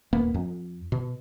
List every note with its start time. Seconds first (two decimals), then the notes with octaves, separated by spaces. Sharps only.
0.13 D#1 A#3 B3
0.34 F2
0.92 B2